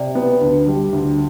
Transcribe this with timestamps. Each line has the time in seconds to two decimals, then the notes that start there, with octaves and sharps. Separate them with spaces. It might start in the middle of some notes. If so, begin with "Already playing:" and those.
Already playing: C3 D5
0.15 B3
0.41 D2
0.67 G3
0.93 D2